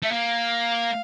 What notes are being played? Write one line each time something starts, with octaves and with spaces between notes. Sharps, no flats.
A3 E5
A#3 F5